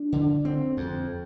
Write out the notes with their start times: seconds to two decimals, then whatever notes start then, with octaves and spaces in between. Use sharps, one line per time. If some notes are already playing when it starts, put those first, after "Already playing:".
Already playing: D4
0.12 D3
0.45 C4
0.77 F2